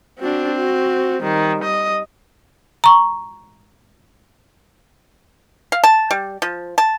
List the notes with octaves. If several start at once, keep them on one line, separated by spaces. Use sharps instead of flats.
C4 D4 F#4
F#4
D#3 G3
D#5
A#5 C#6
F5
A5
G3
F3
A5